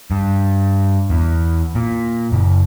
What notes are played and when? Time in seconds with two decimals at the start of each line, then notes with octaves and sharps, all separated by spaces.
0.11 G2
1.10 E2
1.75 A#2
2.32 F#1